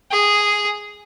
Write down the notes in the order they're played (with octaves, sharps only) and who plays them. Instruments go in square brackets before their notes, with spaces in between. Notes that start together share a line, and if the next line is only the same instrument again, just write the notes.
[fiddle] G#4